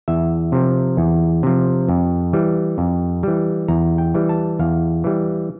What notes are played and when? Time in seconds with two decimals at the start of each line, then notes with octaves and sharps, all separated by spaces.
0.08 E2 E5
0.52 C3 F3
0.97 E2
1.43 C3 F3
1.89 F2
2.33 E3 G3
2.78 F2
3.23 E3 G3
3.68 E2 A#5
3.98 G5
4.14 E3 G3
4.29 A5
4.59 E2 F5
5.04 E3 G3